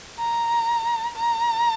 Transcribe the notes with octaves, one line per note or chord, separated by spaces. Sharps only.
A#5
A#5